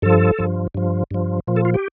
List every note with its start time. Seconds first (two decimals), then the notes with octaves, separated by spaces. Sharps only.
0.02 G2 F3 A4
0.38 G2 F3
0.74 G2 F3
1.11 G2 F3
1.47 A#2 F3
1.56 A4
1.65 F4
1.74 G4